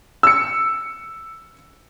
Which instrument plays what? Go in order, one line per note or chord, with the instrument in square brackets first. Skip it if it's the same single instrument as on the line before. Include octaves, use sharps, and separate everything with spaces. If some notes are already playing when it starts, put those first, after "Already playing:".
[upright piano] E6 C#7